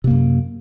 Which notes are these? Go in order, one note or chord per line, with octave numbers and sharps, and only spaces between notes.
F#2 C3 A#3